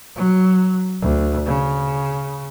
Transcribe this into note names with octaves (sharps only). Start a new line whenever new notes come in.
F#3
D2
C#3